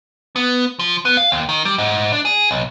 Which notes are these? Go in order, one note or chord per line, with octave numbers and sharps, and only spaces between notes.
B3
F3
B3
F5
D#2
D#3
G3
G#2
D4
G#4
B1